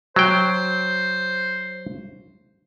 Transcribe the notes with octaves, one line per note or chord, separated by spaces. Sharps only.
F#3 C5 G5